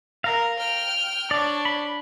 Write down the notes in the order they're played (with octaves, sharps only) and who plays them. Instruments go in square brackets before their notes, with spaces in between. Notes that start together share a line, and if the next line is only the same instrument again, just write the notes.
[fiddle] A#4 [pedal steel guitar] F5 A#5
[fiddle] G5 F6
[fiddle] D4 C#5 [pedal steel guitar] D5
[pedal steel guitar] B5